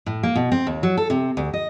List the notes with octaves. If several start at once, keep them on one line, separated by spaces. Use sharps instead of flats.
A2
A#3
B2
C4
D#2
F#3
A4
C3
D2
D#5